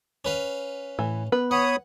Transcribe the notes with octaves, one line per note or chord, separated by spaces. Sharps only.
C#4 B4 F5
A2 E3
B3 B4
C#5 F#5 B5 D#6